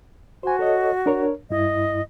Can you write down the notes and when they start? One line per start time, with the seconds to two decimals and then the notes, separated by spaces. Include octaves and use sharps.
0.43 F#4 C5 G#5
0.59 A4 C#5 D#5
1.06 D4 A#4 C#5
1.50 G2 E4 D#5